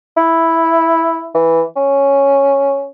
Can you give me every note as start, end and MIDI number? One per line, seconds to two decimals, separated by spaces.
0.17 1.29 64
1.35 1.62 52
1.76 2.86 61